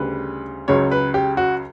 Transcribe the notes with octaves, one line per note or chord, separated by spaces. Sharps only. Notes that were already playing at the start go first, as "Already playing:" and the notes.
Already playing: D2 C#3 G3 B4
C#2 C#3 F#3 C#5
B4
G4
F#4